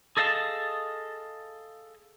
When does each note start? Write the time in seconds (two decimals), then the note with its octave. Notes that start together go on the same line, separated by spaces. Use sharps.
0.17 G#4 A4 D#5 F5 F#5 A5